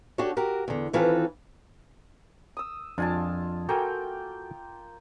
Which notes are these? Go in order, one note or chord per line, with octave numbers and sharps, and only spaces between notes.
D4 F#4 G4 A4 C#5
F#4 G4 A#4
E2 D3
D#3 E3 C4 F4 A4 B4
D#6 E6
F2 D4 F4 G#5 A5
A#3 F#4 A4 G5 G#5